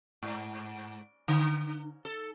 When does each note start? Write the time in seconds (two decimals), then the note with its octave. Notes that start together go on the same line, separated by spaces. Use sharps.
0.23 G#2
1.28 D3
2.05 A4